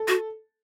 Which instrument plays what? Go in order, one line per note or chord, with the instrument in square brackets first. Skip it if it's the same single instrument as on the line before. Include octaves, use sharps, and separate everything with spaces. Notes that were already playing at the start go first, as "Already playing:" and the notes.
Already playing: [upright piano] A4
[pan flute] F#4